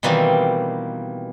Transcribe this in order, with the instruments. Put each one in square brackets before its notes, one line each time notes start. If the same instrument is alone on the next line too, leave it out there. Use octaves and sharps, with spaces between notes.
[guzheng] B2 D#3 E3 G3 A#3 C4